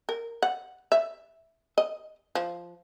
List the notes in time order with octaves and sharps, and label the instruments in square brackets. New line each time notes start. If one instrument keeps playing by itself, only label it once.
[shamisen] A#4
F#5
E5
D#5
F3